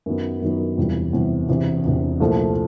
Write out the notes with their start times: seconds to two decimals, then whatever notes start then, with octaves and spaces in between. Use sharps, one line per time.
0.06 F#2 D#3 F#3 B3
0.42 F#2 D#3 F#3 B3
0.77 E1 E2 C3 E3 G3
1.13 E1 E2 C3 E3 G3
1.49 E1 E2 C3
1.84 E1 E2 C3
2.20 C2 A#2 F3 A3